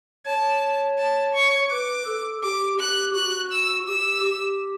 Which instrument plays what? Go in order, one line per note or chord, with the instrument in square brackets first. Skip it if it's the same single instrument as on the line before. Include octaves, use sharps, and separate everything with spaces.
[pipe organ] C#5 [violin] A5
[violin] A5
C#6
[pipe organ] B4 [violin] D6
[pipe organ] A4
[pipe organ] G4 [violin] D6
[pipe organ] G4 [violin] F#6
[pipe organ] F#4 [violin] F#6
[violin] E6
[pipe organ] G4 [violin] E6
[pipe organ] G4